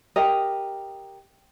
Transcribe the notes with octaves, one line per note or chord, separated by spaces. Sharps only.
G4 A#4 D#5